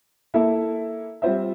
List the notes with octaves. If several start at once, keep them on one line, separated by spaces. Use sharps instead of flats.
A#3 E4 A4 E5
G3 C4 F4 C5 E5